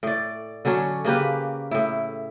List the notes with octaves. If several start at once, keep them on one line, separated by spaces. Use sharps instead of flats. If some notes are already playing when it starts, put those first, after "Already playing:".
A2 D5
D3 F#3 C#4 D4
C#3 A#3 G4 B4
A2 E4